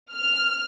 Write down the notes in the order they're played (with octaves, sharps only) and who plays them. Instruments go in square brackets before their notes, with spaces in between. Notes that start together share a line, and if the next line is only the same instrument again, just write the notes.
[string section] F6